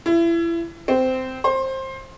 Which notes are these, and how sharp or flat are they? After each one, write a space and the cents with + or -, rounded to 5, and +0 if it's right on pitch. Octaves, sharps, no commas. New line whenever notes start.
E4 +30
C4 -15
C5 +20